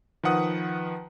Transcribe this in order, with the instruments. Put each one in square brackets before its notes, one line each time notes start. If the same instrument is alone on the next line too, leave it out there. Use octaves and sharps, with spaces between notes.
[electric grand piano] D#3 F3 B4 F#5 D#6